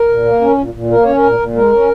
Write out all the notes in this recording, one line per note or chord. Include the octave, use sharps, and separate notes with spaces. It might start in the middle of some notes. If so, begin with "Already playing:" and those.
Already playing: A#4
A#2
A#3
C#4
A#2
A#2
A#3 A#4
C#4 C#5
A#4
A#2
A#2
G#3 A#4
C#4